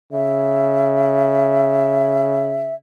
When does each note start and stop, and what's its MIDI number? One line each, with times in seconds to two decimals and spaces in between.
0.13 2.77 49
0.13 2.74 76